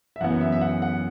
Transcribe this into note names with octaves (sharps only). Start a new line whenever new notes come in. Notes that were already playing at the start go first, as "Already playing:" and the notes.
E5
F#2 E3 B3 F#5
E5
E5
F#5
F#5